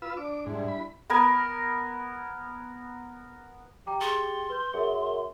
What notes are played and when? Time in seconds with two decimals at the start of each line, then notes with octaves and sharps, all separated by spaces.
0.02 F4 B4 E6
0.17 D4 D6
0.46 G#2 G3 D4 E4
0.68 B5
1.10 B3 A#4 G#5
3.87 G4 G5 A#5 D6
4.01 G#4 C6 A6 C#7
4.50 B4 G6
4.74 F#2 G#4 A#4 E5